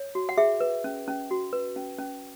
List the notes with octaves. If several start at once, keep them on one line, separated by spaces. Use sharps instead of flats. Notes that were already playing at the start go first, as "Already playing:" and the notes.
Already playing: C#5
F#4
F#5
G#4 E5
B4
C#4
C#4
F#4
B4
C#4
C#4